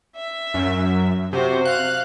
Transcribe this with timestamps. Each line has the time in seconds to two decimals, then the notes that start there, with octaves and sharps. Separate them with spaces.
0.16 E5
0.54 F#2
1.33 C3 F#4 C5
1.65 F5 F#6